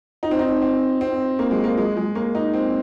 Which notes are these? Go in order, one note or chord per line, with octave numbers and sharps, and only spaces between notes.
D#4
C4
D#4
C4
C4
A#3
G#3
A#3
G#3
G#3
A#3
D#4
C4